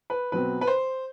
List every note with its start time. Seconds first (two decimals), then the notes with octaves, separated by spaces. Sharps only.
0.10 B4
0.32 B2 F#3 C4 B4
0.61 B4
0.67 C5